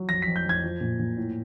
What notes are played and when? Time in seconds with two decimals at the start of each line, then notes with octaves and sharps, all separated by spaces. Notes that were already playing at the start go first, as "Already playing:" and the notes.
Already playing: F#3
0.09 F2 A#6
0.22 F2 B6
0.36 G6
0.45 F2 G#6
0.63 F3
0.81 A#2
0.99 A#2
1.17 A2